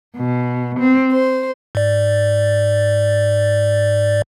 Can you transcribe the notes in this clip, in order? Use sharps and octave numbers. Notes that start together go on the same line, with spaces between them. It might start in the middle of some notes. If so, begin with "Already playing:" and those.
B2
C4
C5
G#2 D5